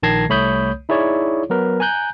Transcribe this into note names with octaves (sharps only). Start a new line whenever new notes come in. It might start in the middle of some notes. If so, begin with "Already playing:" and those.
A#1 D#3 A5 G#6 A#6 C7
C2 A3 C#5 B5 D#6 G6
D#4 E4 G#4 C#5 D5
F#3 B3 A#4 B4
G#5 A#5 F#6 G6